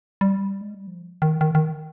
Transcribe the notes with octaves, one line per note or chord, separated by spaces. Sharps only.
G3
G#3
G3
F3
D#3
D#3
D#3